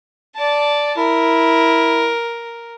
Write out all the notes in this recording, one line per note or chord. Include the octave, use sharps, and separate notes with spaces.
D5 A5
E4 A#4